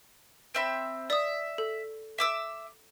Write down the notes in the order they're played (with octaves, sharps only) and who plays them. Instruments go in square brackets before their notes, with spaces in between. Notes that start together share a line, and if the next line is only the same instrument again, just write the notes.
[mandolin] C4 E5 B5
[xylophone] D5 D#6 [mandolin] E5
[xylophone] A4
[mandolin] E5 D6 E6